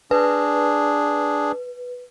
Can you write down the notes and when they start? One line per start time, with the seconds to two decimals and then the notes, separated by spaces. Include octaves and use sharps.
0.11 D4 G#4 B4